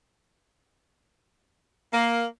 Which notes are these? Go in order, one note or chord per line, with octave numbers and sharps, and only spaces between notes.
A#3